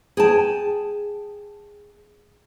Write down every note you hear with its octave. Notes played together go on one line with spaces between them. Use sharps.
G#4 G5 A5